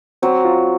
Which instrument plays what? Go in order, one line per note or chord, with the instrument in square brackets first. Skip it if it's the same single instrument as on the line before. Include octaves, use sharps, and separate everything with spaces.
[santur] F#3 [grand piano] C4
[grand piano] F4